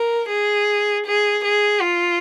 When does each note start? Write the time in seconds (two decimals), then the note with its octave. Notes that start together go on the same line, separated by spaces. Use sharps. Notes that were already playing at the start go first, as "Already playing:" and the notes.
Already playing: A#4
0.29 G#4
1.06 G#4
1.44 G#4
1.81 F4